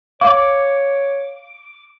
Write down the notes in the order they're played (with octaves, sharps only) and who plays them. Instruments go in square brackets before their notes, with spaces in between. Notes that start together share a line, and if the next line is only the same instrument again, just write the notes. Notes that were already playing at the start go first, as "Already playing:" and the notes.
[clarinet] C#5 [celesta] F5 [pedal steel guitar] D6